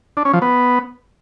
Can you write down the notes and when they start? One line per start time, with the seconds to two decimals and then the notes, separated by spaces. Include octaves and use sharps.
0.17 D4
0.25 C#4
0.33 F3
0.42 B3